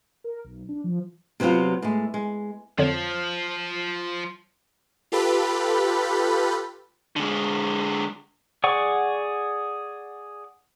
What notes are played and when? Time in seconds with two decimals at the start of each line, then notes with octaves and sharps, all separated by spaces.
0.24 A#4
0.44 B1
0.69 D4
0.84 F3
1.40 C3 F#3 B3 C4 F4
1.82 A2 G#3
2.14 G#3
2.78 F2 D3 F3 C#5
5.12 F4 G4 A4 B4 B5
7.16 D3 G#3
8.64 G#4 D5 F#5 C#6